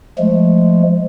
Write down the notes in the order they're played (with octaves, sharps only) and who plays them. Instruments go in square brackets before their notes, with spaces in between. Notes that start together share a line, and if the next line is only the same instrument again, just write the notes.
[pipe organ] F3 G#3 A3